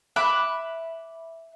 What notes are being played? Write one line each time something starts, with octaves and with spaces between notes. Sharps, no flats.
E5 B5 D6 F#6